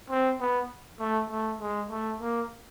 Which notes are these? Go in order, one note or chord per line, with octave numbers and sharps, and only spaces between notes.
C4
B3
A3
A3
G#3
A3
A#3